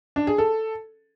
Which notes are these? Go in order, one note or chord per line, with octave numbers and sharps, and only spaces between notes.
D4
G#4
A4